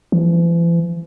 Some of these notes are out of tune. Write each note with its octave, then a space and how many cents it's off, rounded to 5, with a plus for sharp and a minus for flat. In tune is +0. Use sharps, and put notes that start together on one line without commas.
E3 +45